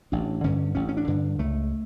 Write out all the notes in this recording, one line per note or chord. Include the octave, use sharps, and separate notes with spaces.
A1 D4
G2 D3 C#4
A1 C#4
C#4
D4
G2 D3
C#2 A3